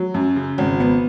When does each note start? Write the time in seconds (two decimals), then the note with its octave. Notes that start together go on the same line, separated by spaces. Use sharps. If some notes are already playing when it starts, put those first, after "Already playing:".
Already playing: F#3
0.14 F#2
0.36 C#3
0.58 G#1
0.80 B3